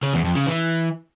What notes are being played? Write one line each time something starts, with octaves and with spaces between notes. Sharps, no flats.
C#3
E2
F2
C#3
E3